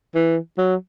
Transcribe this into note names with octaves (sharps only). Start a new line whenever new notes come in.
E3
F#3